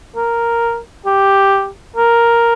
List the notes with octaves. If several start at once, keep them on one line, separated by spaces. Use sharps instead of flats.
A#4
G4
A#4